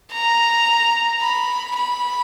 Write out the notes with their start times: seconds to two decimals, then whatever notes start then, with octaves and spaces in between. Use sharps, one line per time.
0.12 A#5
1.21 B5
1.76 B5